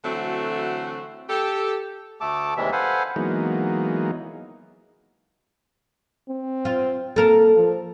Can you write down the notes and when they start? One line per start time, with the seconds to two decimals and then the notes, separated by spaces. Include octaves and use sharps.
0.04 D3 E3 F#3 A3 C4 F#4
1.29 G4 A4
2.21 D2 A3 A4 A5 D6
2.57 D#2 C3 E3 G3 G#3 E5
2.72 A4 B4 C5 F5 F#5 G#5
3.16 E3 F#3 G#3 A#3 B3 D#4
6.29 C4
6.65 F4
7.16 A#3 A4 A#4
7.56 F3